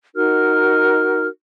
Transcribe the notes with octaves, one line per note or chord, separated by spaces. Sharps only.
D#4 F#4 A#4 F6